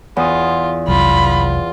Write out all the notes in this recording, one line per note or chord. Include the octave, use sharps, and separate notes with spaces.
E2 F4 D#6
F1 C2 F#3 F4 B5